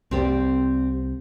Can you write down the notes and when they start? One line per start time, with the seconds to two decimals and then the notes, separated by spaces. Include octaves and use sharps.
0.11 C2 C4 G4 D5